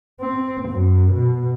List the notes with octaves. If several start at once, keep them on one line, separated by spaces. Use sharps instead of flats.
C4
F#2
B2